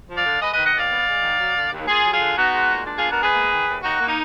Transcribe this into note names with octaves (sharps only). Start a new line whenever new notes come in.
F3
D5 F5
D3
G#3 B4 D#5
D#3 B4 D#5
D#5 F#5
D#2 D5 F5
B3
G#3
D#3
F#3
D3
D#2
A#3 F4 G#4
F#3
F4 G#4
D3
B3 D#4 F#4
G#3
A#2
D4
B3 F4 G#4
F#4 A#4
G#3 G#4 B4
A#3
D#3
D#2
D#2 D#4 F#4
A#3
D#4